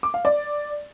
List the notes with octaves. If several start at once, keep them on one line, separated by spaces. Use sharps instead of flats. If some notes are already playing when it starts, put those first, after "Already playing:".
D6
F5
D5